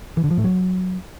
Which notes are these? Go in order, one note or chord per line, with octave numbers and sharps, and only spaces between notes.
E3
D3
F3
A2
F#3